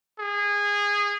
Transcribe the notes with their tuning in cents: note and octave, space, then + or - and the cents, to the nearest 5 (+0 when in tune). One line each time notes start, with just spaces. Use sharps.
G#4 -20